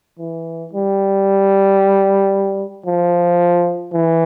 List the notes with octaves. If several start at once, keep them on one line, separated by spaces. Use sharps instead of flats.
E3
G3
F3
E3